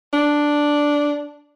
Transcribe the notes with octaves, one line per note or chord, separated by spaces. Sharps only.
D4